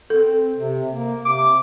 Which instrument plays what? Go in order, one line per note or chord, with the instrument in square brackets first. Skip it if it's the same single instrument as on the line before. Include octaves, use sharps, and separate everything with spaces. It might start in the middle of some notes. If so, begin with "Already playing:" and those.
[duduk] C4 [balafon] A4
[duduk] C3
A#3
[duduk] C3 [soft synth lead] D6